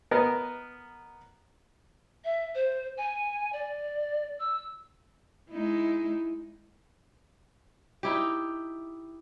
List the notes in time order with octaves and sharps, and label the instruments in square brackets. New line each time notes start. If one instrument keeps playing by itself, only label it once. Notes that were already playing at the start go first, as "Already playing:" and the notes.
[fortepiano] B3 A#4 D#5
[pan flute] E5
C5
G#5
D5
E6
[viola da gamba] G#3 D#4 E4
[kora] D#4 E4 G4